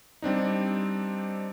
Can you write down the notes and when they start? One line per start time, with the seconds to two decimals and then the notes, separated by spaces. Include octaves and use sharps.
0.22 G3 C4 D4 D#4